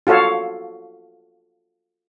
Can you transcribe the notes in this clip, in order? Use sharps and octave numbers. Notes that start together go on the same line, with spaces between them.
F4 F#4 A4 C#5 F5